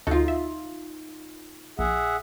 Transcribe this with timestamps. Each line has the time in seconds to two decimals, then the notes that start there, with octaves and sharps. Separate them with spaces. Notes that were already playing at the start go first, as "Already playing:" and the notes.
0.07 D2 D#4 F4 F#4 A4
0.28 E5
1.79 A#1 G#4 E5 F#5